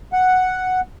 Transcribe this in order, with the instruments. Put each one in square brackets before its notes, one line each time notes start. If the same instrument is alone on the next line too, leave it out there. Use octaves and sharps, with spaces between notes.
[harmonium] F#5